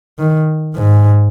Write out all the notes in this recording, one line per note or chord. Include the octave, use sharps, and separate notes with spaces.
D#3
G#2